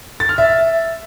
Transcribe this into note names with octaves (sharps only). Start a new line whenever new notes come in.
A6
F6
E5